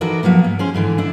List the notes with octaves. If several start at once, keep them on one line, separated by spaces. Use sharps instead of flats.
E3 D#4 F#4 A4 A#4 D5
F3 F#3 A#3 B3
G#2
C#4 G#4 C5
G#2 D3 E3
D4 E4